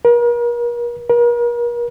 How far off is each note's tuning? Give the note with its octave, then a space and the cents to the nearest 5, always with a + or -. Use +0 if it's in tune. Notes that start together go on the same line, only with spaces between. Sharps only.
A#4 +40
A#4 +40